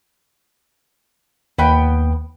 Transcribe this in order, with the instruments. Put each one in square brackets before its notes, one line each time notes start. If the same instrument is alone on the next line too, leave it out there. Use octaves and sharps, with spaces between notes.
[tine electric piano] D#2 [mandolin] B3 G5 B5